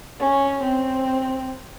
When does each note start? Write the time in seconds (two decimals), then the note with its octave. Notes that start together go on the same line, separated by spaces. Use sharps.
0.20 C#4
0.63 C4